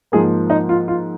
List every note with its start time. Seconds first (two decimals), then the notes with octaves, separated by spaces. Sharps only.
0.12 G#2 F3 A#3 G#4
0.50 D#4
0.69 F4
0.88 F4